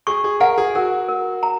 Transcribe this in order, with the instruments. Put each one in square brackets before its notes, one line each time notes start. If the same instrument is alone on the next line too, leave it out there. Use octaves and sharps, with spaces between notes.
[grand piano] G#4 [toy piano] C#6
[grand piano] G#4
[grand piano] A#4 [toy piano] F#5
[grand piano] G#4
[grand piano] F#4 [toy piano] A#4
[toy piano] A#4
A#5